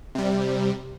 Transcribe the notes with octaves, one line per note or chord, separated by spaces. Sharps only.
C3 G3